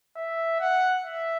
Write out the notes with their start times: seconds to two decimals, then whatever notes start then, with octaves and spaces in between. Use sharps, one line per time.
0.17 E5
0.60 F#5
1.05 E5